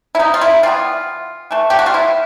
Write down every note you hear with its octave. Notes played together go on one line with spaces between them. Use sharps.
E4
D#4
F4
E4
E3 G3 B3 F4
E3 A3
G4
F#4
F4
E4